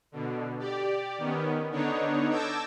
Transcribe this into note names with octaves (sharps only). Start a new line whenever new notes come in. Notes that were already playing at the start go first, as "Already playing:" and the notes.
B2 D3
G4 D5
D#3 B3 C#4
D3 B3 D4 D#4 C#5
A5 D6 E6 G6 G#6 A#6